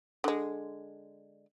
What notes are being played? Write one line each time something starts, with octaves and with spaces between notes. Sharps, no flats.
D3 G#3